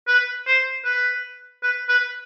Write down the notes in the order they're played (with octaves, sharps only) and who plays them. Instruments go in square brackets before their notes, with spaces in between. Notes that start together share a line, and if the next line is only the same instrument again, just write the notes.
[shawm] B4
C5
B4
B4
B4